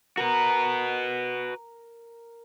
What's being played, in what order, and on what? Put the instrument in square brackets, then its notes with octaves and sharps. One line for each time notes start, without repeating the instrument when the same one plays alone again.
[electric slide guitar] F#4 B4 [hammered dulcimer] A#4